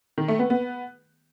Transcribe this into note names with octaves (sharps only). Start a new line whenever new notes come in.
D#3
A3
B3
B3